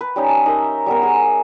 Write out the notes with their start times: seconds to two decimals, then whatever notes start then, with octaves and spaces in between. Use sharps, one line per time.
0.01 B4
0.16 G3 C#4 D#4
0.28 A5
0.46 D#4 A#4 D#5 E5
0.86 G3 B3 A#4
1.03 G#4